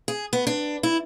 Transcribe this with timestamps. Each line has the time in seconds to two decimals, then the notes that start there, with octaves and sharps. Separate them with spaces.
0.08 G#4
0.33 B3
0.47 D4
0.83 E4